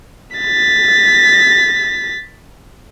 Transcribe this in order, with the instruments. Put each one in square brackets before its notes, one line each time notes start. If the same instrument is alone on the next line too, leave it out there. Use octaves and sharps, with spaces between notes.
[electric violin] A6 B6